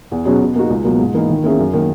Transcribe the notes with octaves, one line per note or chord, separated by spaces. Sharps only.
E2
B2 F#3 C#4 G#4
B2
A#3 D#4 F#4
C#2
B2 F#3 A#3
G#2
E3 A#3 D#4
D#3
A#3 C#4 E4 G#4
F#2
D#3 A#3